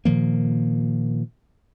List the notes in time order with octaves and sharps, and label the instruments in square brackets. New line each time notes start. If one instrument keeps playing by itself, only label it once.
[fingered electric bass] A#2 D#3 F3 A#3